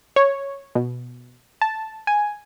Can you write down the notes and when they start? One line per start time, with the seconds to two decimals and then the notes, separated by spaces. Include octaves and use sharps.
0.16 C#5
0.75 B2
1.62 A5
2.07 G#5